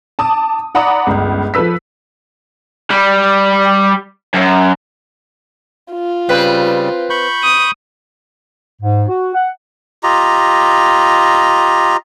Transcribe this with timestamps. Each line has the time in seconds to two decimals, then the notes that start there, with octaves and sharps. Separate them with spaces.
0.19 A5 D6 D#6
0.75 D5 F#5 A#5 B5 D6 D#6
1.07 G1 C#2
1.54 F3 A4 B4 E6 B6
2.91 G3
4.34 F#2
5.92 F4
6.29 C#3 G3 C4 B4
7.10 B5 C#6 G6
7.43 D#6
8.82 G#2
9.08 F#4
9.35 F#5
10.03 F4 G4 D#5 A#5